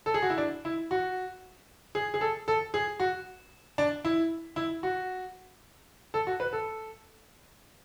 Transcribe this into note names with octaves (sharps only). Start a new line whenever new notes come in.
A4
G#4
F#4
E4
D4
E4
F#4
G#4
G#4
A4
A4
G#4
F#4
D4
E4
E4
F#4
A4
F#4
B4
A4